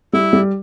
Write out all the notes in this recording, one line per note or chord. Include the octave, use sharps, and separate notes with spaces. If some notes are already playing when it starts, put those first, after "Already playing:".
G3 E4
G3